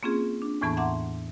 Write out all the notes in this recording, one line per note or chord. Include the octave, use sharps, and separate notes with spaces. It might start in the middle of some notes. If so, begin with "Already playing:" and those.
A#3 C4 C#4 F4 G#4
D4
E2 A2 E3 B3 A5 C#6
E5 F#5 A5 A#5 C6 D6